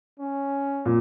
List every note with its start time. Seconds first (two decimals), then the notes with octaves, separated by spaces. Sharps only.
0.20 C#4
0.85 A#2